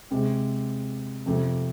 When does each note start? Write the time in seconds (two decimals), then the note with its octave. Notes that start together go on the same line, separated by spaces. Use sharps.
0.11 C3 G#3 C4
1.26 F2 C3 F3 A3 C4